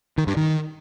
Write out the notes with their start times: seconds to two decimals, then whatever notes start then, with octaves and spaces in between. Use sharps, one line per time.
0.18 D#3
0.27 G2
0.37 D#3